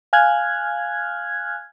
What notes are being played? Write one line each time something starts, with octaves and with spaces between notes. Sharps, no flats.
F5 G#5 F6 F#6 G#6